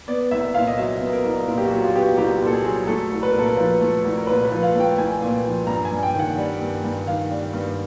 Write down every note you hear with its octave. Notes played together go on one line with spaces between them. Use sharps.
B3 D5
C2 E5
A#2 F5
D#5
F#3 E5
B3
A#4
C2
A#2 A#4
G4
F#4
F#3
F#4
F4
B3 G4
F#4
C2 G4
A#2
A4
G#4
F#3
A3 A4
C2
B4
A#4
A#2 A4
A#4
F3 B4
A3
C2
A#4
A#2 B4
B4
F3
F5
A3
G5
C2 G#5
A#2
F3
G2 A#5
G#5
G2
G5
D#3 F#5
G3
G2
G2
D#3 F5
G3
G2